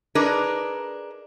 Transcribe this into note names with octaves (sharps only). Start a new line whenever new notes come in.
D4 D#4 G#4 A#4 B4 D5